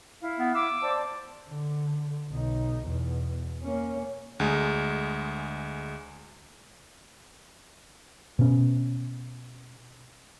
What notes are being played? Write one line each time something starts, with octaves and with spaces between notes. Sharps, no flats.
E4 F5
B3
D6 E6
C5 D5 A5
D3
B1 D#4
E2 B2
A#3 C#4
D2 G#3
B2 C#4